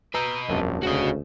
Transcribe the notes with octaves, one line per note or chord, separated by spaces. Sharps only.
B4 D#5 A#5 E6 G6
E1 A#1 F#2 C3 A5
D2 C#3 F#4 D#5